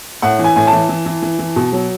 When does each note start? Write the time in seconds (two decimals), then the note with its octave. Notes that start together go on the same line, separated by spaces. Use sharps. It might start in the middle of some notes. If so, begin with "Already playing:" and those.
0.22 A2 F#5
0.39 E3
0.44 G#5
0.56 A2 G#5
0.67 A5
0.73 E3
0.89 E3
1.06 E3
1.22 E3
1.39 E3
1.56 B2
1.73 F#3